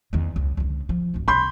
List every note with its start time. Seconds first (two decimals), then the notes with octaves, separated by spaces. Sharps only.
0.13 E2 D#3
0.36 C#2
0.57 C#2 D3
0.89 F3
1.14 G#1 D2
1.28 C2 B5 C6 G6